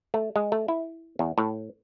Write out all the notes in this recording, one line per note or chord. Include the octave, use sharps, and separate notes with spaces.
A3
G#3
A3
E4
E2
A2